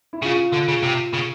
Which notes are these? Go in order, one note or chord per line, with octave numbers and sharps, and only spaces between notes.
E4
C#3 F4
D3
C#3
C3
C#3